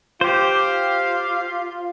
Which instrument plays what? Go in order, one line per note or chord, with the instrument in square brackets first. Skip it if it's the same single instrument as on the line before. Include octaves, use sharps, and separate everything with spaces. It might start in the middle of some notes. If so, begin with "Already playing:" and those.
[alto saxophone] F4 [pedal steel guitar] G4 C5 [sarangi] F5